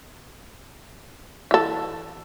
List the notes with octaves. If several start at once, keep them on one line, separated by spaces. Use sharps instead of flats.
E3 A4